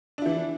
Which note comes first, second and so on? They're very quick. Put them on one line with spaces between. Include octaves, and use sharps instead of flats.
D4 E4 E3